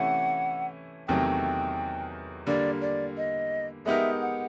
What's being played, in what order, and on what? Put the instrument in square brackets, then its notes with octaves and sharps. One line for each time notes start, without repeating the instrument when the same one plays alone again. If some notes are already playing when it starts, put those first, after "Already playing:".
Already playing: [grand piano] C3 E3 A3 C#4 E4 [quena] F#5
[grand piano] E2 C3 D#3 F#3 A3 [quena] G5
[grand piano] D3 G3 A#3 [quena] D5
[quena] D5
D#5
[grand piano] G#3 B3 D#4 G4 A#4 [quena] E5
[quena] F#5